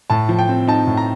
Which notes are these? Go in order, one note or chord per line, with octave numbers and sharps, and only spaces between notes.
A2 A5
F3
G5
C4
D#4 A5
A2
A#5